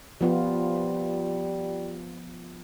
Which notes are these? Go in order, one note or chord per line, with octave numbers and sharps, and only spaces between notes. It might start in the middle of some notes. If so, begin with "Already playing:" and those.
F3 G3 B3 F4